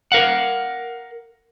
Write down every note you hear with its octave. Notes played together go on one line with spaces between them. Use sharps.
A#4 F5 F#5